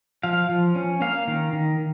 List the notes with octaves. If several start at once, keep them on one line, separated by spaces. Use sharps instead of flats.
F3 F5
F3
C#4
A#3 F5
D#3
D#3